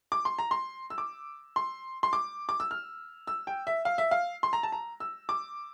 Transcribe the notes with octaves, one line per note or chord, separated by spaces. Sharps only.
D6
C6
A#5
C6
E6
D6
C6
C6
D6
D6
E6
F6
E6
G5
E5
F5
E5
F5
C6
A#5
A5
A#5
E6
D6